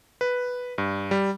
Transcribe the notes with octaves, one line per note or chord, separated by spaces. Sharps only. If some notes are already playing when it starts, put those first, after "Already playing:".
B4
G2
G3